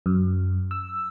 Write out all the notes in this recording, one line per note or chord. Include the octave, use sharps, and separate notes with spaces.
F#2
E6